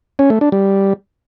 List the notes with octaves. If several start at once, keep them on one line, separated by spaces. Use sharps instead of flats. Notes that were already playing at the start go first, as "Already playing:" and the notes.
C#4
A3
D4
G3